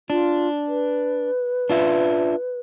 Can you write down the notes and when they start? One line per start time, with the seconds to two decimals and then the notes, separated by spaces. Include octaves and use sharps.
0.10 D4 F4
0.68 B4
1.70 D4 F4 E5